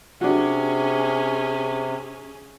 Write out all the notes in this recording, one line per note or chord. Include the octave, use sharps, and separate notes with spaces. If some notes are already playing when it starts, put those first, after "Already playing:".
C3 C#4 D4 F#4 G#4